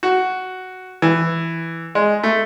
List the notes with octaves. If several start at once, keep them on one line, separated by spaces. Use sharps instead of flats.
F#4
E3
G#3
A3